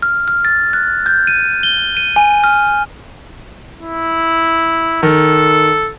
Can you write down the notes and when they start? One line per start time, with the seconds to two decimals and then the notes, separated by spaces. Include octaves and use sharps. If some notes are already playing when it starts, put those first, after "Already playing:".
0.02 F6
0.28 F6
0.45 A6
0.73 F#6
1.06 G6
1.27 D#7
1.63 G7
1.97 D#7
2.16 G#5
2.44 F6
3.80 E4
5.03 D#3 A4